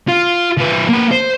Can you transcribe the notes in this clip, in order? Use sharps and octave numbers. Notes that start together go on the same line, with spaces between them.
F4
F3 B4
A#3 B4
C5